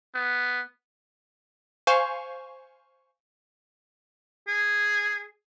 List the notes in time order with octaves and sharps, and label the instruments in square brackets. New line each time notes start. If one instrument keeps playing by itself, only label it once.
[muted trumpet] B3
[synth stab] C5 F5 G#5 C#6
[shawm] G#4